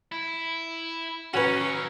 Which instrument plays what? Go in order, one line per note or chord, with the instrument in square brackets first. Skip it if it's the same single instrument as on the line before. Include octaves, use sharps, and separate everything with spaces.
[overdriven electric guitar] E4
[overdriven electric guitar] D#3 F#3 [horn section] C#4 [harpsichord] F#4 B4